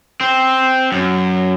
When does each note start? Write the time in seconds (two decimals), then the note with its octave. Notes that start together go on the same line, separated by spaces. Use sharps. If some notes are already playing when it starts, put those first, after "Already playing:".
0.21 C4
0.92 F#2